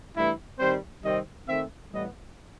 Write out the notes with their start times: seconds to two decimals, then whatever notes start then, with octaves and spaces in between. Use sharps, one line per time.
0.16 G2 E3 A3 E4
0.59 D#3 G3 C4 C5
1.03 C3 D#3 G3 C4 D#5
1.48 D#3 A3 C4 E5
1.91 A2 E3 G3 B3 D#5